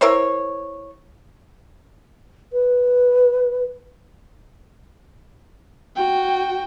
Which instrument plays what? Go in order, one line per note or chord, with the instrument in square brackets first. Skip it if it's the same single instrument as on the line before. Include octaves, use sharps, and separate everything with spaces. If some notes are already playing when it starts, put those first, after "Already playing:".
[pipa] E4 A#4 C5 C#5
[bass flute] B4
[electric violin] F#4 G5